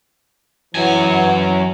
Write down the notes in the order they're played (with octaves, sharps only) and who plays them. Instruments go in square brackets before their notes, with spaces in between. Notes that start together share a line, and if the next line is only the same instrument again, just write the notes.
[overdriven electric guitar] F#2 G#5 [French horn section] E3 [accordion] F#3